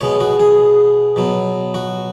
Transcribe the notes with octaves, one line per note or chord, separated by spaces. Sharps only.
B2 G#3 B3 C#5
F#4
G#4
B2 F#3 B3
F#4